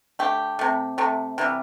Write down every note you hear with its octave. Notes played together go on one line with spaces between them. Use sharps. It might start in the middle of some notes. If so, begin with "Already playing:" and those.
D3 A3 G4
C3 A3
C3 A3
C3 E3 G3